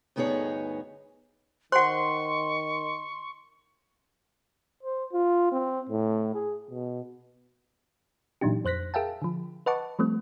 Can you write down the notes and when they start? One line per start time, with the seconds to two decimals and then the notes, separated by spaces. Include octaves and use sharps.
0.16 D2 G2 B3 D#4 G#4 C#5
1.72 D#3 C5 F#5 C6 C#6
4.83 C5
5.13 F4
5.52 C4
5.89 A2
6.34 G#4
6.71 B2
8.41 A#2 E3 F#3 D4 D#4 G4
8.65 F2 C5 F#6 A#6 B6
8.94 G#4 A#4 E5 F5 G5 A5
9.22 D3 F3
9.66 B4 D#5 F#5 A5 C#6 D6
9.99 F3 G3 A3 C4